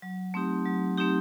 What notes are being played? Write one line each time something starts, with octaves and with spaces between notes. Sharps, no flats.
F#3
A3 C4 D#4 G4
F#3
A3 C4 D#4 G4